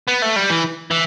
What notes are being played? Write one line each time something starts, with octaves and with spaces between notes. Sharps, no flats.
B3
A3
G3
E3
E3